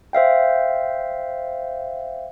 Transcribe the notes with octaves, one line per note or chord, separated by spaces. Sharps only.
C5 E5 F5 G5